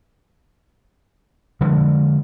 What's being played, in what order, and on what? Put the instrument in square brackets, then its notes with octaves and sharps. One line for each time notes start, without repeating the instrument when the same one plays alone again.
[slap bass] D3 F3 G3 G#3